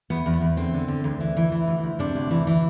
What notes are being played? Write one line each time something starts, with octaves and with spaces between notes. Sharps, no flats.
E2 B3
E2
B3
E2
D3 C4
D3
D3
D2
E3
E3
E3
D2
D2
C3 D4
D2
E3
E3